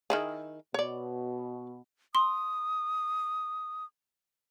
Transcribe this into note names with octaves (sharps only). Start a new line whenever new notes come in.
D#3 E4 G#4
B2 C#5 D5
C6 D#6